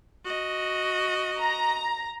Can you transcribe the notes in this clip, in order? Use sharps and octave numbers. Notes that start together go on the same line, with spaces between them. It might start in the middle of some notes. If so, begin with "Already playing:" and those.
F#4 D#5
A#5